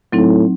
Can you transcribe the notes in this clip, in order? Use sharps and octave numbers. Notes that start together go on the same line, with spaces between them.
A2 F#3 C4 D#4